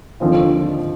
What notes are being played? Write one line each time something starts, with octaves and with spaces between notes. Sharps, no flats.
D#2 D3 F3 C4 F4